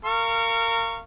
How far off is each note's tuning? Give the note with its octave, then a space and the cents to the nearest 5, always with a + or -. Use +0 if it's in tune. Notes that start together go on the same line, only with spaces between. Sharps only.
A#4 -25 F5 -30 C#6 +0